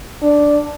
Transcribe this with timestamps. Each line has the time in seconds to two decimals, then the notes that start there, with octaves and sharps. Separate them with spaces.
0.22 D4